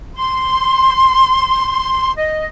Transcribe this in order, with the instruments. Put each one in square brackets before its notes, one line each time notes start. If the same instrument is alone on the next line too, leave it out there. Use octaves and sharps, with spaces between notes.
[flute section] C6
D#5